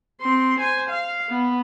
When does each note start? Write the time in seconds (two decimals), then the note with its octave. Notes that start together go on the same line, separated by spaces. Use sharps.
0.21 C4 C6
0.59 C5 G#5
0.89 F5
1.29 B3